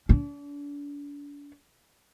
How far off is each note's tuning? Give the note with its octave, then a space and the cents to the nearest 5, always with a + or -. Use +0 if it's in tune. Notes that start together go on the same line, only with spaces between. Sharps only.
D4 -40